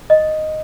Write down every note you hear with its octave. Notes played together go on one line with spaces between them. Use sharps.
D#5